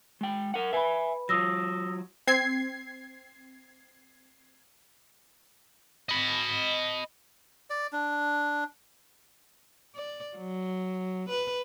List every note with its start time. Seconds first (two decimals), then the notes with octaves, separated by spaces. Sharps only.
0.21 G#3 G5
0.54 A#4 F#5
0.73 B4 E5 G#5 B5
1.29 F#3 F4 D#6 E6 A#6
2.27 C4 G#6 C7
6.09 D#5 B5
7.70 D5
7.93 D4
9.95 D5
10.37 F#3
11.29 B4